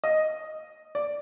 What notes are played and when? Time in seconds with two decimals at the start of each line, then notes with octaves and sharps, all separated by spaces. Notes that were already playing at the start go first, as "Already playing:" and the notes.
0.04 D#5
0.95 D5